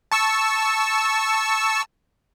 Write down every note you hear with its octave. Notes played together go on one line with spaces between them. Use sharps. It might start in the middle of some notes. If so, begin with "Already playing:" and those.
A5 C#6 E6